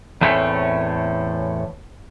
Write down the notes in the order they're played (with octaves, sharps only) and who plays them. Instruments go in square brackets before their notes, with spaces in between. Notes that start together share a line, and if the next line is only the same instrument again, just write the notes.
[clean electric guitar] E2 A2 A3 C4 C#4